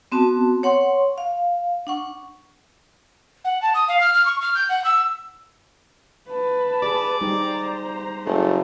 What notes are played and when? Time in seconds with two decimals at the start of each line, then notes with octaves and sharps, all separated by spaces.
0.12 B3 C4 F#4 A5
0.63 C#5 F#5 C6 C#6
1.18 F5
1.87 D4 F#5 C#6
3.44 F#5
3.62 A5
3.74 D#6
3.88 F5
4.00 F6
4.14 F6
4.26 C#6
4.41 F6
4.55 G6
4.69 F#5
4.84 E6
6.29 B4 A5
6.82 G4 G#4 D5
7.21 G3 D#4 G4 C5 A#5
8.26 F#1 A3